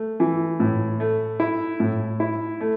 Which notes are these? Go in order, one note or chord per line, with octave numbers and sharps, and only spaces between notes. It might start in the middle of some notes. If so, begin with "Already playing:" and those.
Already playing: A3
E3
A2
A3
E4
A2
E4
A3